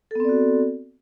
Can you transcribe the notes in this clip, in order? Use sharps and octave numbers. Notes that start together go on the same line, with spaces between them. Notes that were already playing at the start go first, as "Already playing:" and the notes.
B3 C4 F#4 A4 D5